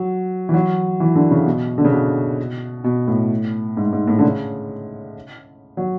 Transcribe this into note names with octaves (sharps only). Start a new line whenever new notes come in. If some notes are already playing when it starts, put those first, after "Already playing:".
Already playing: F#3
E3
F#3
E3
D3
C#3
B2
D3
C#3
B2
B2
A2
G#2
G#2
A2
D3
C#3
F#3